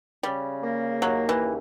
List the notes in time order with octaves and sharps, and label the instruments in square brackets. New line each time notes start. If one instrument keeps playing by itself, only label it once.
[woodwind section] C#3 [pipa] G3
[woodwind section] A#3
[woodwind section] D#2 [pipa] F#3
[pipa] E3
[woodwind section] C#3